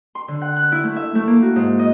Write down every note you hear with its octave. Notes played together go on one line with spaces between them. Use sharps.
C6
D3
F#5
F#6
E4
A3
E5
A3
A#3
F#4
G#2
D#5